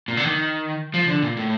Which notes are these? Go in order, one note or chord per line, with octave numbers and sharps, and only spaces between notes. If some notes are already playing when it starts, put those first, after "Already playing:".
A#2
D3
D#3
F3
D3
A#2
A2